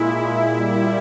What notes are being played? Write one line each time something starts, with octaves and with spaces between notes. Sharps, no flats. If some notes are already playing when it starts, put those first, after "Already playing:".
Already playing: A#2 G#3 E4
A#2 G3 E4